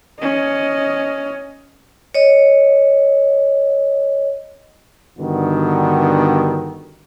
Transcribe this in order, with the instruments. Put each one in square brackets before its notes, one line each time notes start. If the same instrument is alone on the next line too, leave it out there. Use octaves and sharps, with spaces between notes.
[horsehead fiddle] C#4 D#5
[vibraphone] C#5 D#5
[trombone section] G2 D3 D#3 B3 F#4